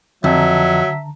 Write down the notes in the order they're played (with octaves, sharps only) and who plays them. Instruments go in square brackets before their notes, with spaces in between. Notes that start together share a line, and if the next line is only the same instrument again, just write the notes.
[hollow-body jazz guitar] F2 [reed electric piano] D3 A5 A#5 [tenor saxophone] F#3 [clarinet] E5